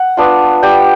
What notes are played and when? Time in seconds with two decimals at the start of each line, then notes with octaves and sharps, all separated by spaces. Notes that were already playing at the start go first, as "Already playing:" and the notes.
Already playing: F#5
0.17 B3 D4 F4
0.63 G3 G5